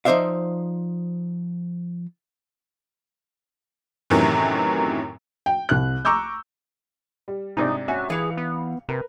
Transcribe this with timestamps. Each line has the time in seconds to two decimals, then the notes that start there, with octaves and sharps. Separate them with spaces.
0.05 F3 D#4 C5 D5 E5 F5
4.10 F#2 A2 C3 D#3 E3 F#3
5.46 G5
5.69 C2 F#6
6.05 A#5 C#6 D6 E6 G6
7.28 G3
7.57 G#2 C3 D4 D#4
7.88 C#4 F#4 E5 G#5
8.10 E3 G#4 B4 F5 C#7 F7
8.37 B3
8.89 C3 A#4 B4